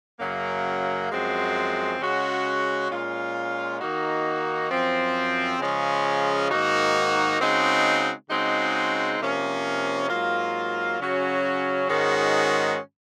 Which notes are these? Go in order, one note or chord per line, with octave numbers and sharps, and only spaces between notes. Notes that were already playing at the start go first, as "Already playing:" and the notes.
F#2 C#3 F#3 A#3
F#2 F3 G#3 C4 F#4
C#3 G#3 C#4 F#4
A#2 G#3 C#4 F4
D#3 A#3 D#4 F#4
F#2 F3 C4
C#3 F3 G#3 C#4
G#2 D#3 A#3 D#4 F#4
C#3 G#3 C4 D#4 F#4
C#3 G#3 C4 D#4 F#4
C3 F3 A#3 C#4
G#2 F#3 A#3 F4
C#3 F#3 C#4 F#4
G#2 D#3 G#3 C#4 F#4